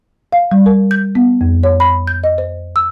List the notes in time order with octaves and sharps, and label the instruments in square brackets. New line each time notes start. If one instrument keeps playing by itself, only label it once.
[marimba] F5
G3
A#4
G6
B3
F2
C#5
B5
G6
D#5
C5
E6